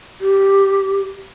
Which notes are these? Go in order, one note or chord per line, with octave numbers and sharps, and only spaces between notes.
G4